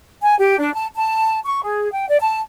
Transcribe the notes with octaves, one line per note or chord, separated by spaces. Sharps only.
G#5
G4
D4
A5
A5
C#6
G#4
G5
D5
A5